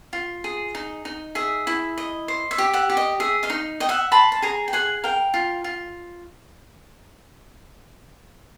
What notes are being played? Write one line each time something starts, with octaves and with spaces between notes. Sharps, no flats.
F4
G#4
D#4
D#4
G#4 E5
E4
D#5
C5
E5
G4
E5 F#5
G4
D#5
G#4 E5
D#5 F5
D#4
D#5 G5
E5 F#5
C5 A5 B5
A5
G#4 G#5 A#5
G5
G#4 F#5 G#5
A#4 F5 G5
F4
F4